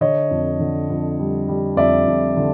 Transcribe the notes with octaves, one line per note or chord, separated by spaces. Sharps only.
D3 C#5 D#5
F2
D3
F2
G3
G3
F2 D5 E5
F2
D3